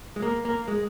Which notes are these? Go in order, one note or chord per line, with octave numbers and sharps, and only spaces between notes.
G#3
A#3
A#3
G#3